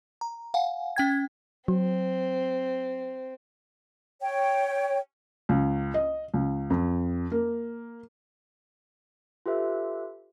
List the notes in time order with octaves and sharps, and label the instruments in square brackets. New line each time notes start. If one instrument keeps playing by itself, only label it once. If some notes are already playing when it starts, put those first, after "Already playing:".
[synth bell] A#5
F5 F#5 G#5
C#4 G5 G#6
[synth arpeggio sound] F#3 [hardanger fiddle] C4
[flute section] C#5 G5
[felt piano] C#2
D#5
C#2
F2
A#3
[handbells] F4 G4 A4 B4 E5